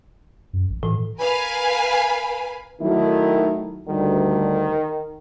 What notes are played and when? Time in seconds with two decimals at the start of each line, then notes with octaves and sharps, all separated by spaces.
0.53 F#2
0.70 A1
0.83 A2 E3
1.18 A#4 B4 F5 G#5 B5
2.81 D#3 F#3 A3 E4
3.88 D2 D#3 G3